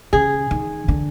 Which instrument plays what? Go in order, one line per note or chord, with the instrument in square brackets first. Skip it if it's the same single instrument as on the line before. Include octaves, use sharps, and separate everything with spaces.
[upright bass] C#3 [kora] G#4
[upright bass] D#3
D3